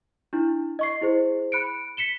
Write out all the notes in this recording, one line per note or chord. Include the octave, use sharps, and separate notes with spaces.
D4 E4
D#5 C#6 C7
E4 G#4 C5
B5 F#6 C#7 D7
B6 C#7 E7 G7